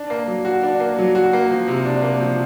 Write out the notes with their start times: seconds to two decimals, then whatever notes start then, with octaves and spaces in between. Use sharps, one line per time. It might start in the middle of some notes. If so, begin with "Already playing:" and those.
Already playing: D4
0.10 A#3
0.28 F#3
0.45 F#4
0.63 D4
0.80 A#3
0.98 F#3
1.15 F#4
1.33 A#3
1.51 F3
1.68 C3
1.85 D4
2.02 A#3
2.20 F3